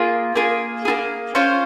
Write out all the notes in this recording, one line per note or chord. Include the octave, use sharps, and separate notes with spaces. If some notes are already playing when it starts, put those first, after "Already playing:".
Already playing: A#3 F4 G#4
A#3 F4 G#4
A#3 F4 G#4
C#4 F4 C5 F5